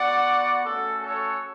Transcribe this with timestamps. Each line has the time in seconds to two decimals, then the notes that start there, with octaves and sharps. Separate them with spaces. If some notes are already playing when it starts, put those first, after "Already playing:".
Already playing: B3 F#4 D5 F#5
0.64 A3 C#4 F#4 A4
1.00 A4 C#5